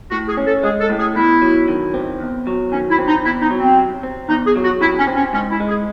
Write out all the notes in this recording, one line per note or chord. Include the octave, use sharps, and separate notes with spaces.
A2 F#4
G#4
C#4
A4
G#3 G#4
A4
A2
G#4
E2 E4
F#3
D#3
C4
E2
F#3
D#3 C#4
E4
C4
D#4
E2 E4
D#4
F#3
C4
C3
C4
E2 D#4
G#4
F#3
F#4
C3 E4
C#4
C4
C#4
G#2 C#4
E4
G#3
G#4